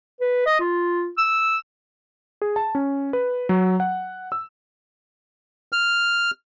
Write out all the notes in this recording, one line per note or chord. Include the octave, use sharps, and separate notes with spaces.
B4
D#5
F4
E6
G#4
A5
C#4
B4
F#3
F#5
E6
F6